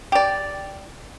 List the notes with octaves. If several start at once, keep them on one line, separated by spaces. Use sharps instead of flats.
G4 D5